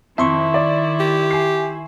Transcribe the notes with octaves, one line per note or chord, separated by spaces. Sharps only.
F2 D#3 E4 E5 C6 C#6
D5
G4
G#5 C7